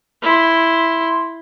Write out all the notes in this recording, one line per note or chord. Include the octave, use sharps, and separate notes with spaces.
E4 C6